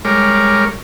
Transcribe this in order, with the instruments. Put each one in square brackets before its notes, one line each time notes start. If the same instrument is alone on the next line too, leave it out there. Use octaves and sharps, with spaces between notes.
[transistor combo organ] G3 G#3 A#4 C#5 D6 F6